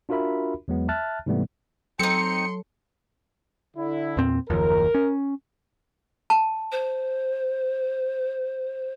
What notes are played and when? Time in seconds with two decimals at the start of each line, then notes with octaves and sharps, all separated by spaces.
0.09 D4 F4 F#4 A#4 E5 B5
0.68 E2 F#3 G#3 B3
0.89 E5 A5 F6 F#6 A6
1.26 G#2 C3 E3 G3 A3 B3
1.99 F#3 C4 D#4 A4 C6 C#7
3.77 D3 E4
4.17 E2 A#2 C4
4.50 F#1 D#2 F3 A#4
4.94 C#4
6.30 A5
6.72 C5